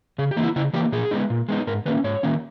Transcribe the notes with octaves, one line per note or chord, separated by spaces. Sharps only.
C#3 G#4
G4
E3 A#3
E4
C#3 E4
E3 A#3 G4
A#2 G#4
G#3 B3 D#4
A#2
G#3 B3 D#4
G#2 A#4
D#3 A#3 C#4 B4
G#2 C#5
D#3 A#3 C#4